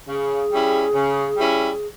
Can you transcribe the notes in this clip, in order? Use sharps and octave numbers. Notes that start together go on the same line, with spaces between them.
C#3 G#4
G3 C#4 E4
C#3
G3 C#4 E4